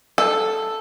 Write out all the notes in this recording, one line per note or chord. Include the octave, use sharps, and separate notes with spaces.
A4